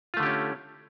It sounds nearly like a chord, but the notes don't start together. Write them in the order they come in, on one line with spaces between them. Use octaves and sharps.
F4 A3 D3 G4 C#4